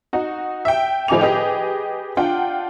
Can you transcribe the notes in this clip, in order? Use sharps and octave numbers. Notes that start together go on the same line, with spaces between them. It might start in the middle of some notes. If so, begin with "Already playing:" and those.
D#4 F#4
E5 G5
A2 F3 D#4 G#5 D6 F7
G4 G#4 B4 D#5 G5
D4 F4 F#5 G5